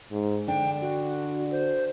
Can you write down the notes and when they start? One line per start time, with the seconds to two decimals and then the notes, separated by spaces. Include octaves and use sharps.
0.11 G#2
0.48 D3 D4 G5
0.82 F#4
1.51 C5